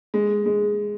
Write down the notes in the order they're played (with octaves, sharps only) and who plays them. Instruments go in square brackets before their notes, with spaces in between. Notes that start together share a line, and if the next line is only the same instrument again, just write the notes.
[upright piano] G#3
G#3